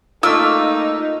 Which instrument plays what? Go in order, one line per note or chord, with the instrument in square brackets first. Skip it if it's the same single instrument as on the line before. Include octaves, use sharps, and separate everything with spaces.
[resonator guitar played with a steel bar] A3 A#3 F4 [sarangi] D#4 [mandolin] E6